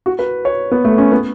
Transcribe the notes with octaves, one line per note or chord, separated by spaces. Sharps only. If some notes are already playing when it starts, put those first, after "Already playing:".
F#4
B4
C#5
B3
A3
C#4
B3